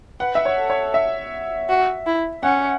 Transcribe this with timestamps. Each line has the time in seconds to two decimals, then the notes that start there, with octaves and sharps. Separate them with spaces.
0.20 B4 F#5
0.35 E5
0.45 C#5
0.57 A4
0.70 C#5
0.94 E5
1.69 F#4
2.06 E4
2.43 C#4 F#5